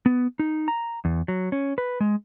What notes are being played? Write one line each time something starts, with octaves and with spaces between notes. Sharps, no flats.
B3
D#4
A#5
E2
F#3
C#4
B4
G#3